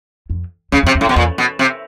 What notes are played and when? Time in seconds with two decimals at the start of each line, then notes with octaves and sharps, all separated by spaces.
0.30 F2
0.72 E2 C#3
0.83 F2
0.87 C3
0.95 E2
1.01 A2
1.05 F2
1.09 B2
1.16 E2 A#2
1.38 B2
1.59 C3